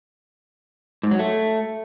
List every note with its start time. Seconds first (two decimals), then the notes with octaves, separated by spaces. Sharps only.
1.03 G#2
1.11 F#3
1.19 A3